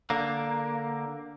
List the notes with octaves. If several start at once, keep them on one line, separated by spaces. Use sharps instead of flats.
D3 A#3